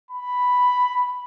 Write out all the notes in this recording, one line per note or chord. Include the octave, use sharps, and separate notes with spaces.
B5